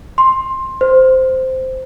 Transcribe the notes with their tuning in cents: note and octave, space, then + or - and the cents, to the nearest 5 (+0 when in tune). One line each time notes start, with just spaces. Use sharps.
C6 +15
C5 -5